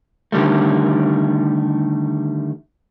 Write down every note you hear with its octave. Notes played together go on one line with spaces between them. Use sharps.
D3 D#3 G3 A3